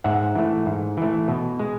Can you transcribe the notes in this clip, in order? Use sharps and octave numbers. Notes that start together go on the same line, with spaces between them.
G#2 E5 F#5
E3 A3
G#2
E3 A3
B2
G#3